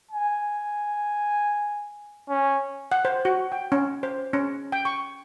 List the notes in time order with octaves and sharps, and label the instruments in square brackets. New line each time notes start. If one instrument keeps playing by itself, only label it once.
[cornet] G#5
C#4
[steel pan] F#5
C5
F#4
G5
C#4
C5
C#4
G5
C#6